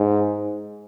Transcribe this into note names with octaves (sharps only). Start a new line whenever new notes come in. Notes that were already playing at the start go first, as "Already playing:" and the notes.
Already playing: G#2